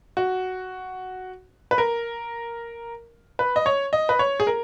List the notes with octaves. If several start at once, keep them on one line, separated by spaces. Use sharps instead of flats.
F#4
B4
A#4
B4
D#5
C#5
D#5
B4
C#5
G#4
A#4